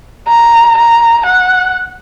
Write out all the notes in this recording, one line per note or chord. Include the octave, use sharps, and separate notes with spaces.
A#5
A#5
F#5